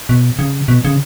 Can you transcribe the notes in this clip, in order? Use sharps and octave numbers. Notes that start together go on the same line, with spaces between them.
B2
C#3
B2
C#3